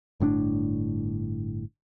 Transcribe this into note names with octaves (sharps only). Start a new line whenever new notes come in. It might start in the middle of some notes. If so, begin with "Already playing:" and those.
G1 A2 C4 D4